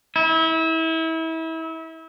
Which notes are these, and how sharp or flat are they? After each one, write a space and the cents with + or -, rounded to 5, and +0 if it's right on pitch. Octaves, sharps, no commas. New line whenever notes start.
E4 -30